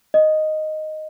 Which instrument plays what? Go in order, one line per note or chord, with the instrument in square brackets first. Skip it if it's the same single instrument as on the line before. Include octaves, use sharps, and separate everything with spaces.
[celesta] D#5